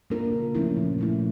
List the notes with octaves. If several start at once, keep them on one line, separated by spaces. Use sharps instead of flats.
A#3 D4 F4 A#4
C#3
F3 A3 C#4 E4
A#2
F3 A3 E4